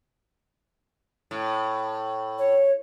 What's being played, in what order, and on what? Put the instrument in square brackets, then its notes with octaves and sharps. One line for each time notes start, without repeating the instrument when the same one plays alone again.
[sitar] A2
[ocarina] C#5